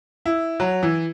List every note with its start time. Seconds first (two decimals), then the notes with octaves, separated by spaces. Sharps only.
0.26 E4
0.60 F#3
0.83 E3